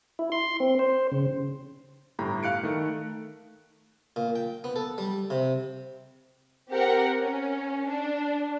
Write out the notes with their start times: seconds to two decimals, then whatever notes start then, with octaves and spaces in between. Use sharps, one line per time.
0.19 E4
0.32 C6
0.60 C4
0.79 C5
1.12 C#3
2.19 G1 A2 G4 A#5 B5
2.43 F5 F#6 C#7 D7
2.63 D#3 A3
4.16 A#2
4.36 G5
4.64 B3
4.76 A4
4.98 G3
5.30 C3
6.69 C4 G4 A#4 F#5
7.21 C#4
7.89 D4